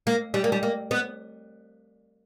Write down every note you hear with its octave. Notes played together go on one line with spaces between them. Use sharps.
A#3
G3
A#3
G3
A#3
B3